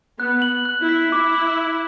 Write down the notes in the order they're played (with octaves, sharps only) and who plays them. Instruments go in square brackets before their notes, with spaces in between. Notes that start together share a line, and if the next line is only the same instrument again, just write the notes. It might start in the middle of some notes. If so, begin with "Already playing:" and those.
[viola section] B3 [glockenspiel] F#6
[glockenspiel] F#7
F#6
[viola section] E4
[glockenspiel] B6
[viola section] E4 [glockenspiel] D6
[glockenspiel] F#7
D6